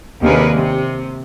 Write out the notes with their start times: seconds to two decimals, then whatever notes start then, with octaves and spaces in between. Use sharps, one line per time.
0.22 D#2 C3 D4 G#4 A#4 B4
0.54 C3